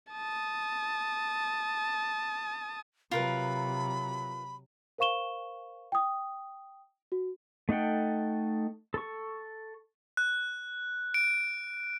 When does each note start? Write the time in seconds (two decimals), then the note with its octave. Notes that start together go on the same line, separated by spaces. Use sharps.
0.12 A5 D#6
3.11 C3 F#3 F4 A#4 B4 B5
4.98 A#4 C5 F5 C#6 E7 G7
5.92 G5 D#6
7.12 F#4
7.69 A3 D#4 A4 F#5 G5
8.94 A4 C#6
10.17 F#6
11.14 D7